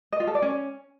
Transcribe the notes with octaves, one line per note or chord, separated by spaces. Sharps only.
D#5
F4
A4
D5
C#4